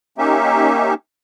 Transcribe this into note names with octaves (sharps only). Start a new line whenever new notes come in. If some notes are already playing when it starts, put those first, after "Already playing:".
A#3 C#4 D#4 G4 E5